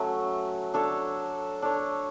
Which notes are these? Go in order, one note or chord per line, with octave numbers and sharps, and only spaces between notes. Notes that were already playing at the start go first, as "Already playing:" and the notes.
Already playing: F#3 A3 C#4
D4 A4 C#5
D4 A4 C#5